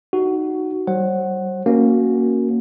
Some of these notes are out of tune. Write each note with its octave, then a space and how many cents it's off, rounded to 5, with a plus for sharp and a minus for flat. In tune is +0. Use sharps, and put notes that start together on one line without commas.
D#4 +0 F#4 +10
G3 -40 C5 +40 F#5 +5
A#3 +0 C#4 +0 F#4 +0